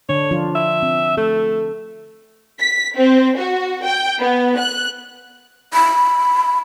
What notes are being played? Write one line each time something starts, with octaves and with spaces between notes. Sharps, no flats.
D3 D4 C#5
F3 D4 F4
E5
C4
A3 A4
B6
C4
F#4
G5
B3
F#6
B5